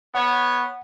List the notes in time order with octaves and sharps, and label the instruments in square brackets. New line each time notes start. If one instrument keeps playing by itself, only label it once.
[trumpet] B3 [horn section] C#5 [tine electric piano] F#5